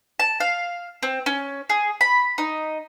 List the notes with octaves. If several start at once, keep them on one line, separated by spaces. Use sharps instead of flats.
A5
F5
C4
C#4
G#4
B5
D#4